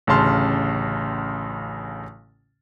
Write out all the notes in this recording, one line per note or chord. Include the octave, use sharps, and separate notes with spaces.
A1 D2 C#3 A5 C6 F6